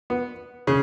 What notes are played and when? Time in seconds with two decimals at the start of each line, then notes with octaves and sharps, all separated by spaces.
0.10 B3
0.67 C#3